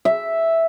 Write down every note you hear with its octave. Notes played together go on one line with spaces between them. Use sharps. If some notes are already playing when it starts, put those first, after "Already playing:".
E5